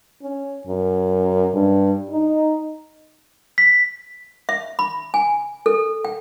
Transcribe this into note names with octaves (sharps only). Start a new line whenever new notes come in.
C#4
F#2
G2
D#4
B6
E5
B5
G#5
A4
G5